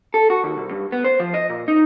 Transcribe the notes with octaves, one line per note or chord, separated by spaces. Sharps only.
A4
F#4
D#2
C2
G2
B3
C5
F3
D#5
A#2
D#4